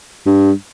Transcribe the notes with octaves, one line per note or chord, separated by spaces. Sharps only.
G2